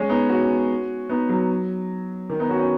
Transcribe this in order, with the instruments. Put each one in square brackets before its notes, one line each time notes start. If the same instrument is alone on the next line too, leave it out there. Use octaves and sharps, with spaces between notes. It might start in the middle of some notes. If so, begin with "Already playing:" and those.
Already playing: [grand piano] G#3 C#4
B3 D#4
C#4 F#4
B3 D#4
F#3
D#3
B3 D#4
C#4 F#4
C#4 F#4